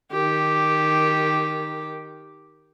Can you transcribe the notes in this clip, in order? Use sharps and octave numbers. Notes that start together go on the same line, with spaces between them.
D#3 G4